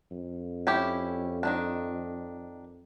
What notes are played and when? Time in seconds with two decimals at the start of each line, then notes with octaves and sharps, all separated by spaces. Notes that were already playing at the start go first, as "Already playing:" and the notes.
0.11 F2
0.67 C#4 E4 G4
1.43 D#3 F#3 D4